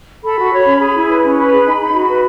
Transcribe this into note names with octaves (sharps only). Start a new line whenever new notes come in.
A4 B5
F#4
C#5
C#4
G#4
E4
B4
C#4
B4 B5
G#4
D#4
D#4
F#4
B4